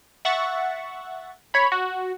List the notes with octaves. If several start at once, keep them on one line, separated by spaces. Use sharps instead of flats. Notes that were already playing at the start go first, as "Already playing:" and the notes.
E5 F#5 C#6 A6
C#5 B5
F#4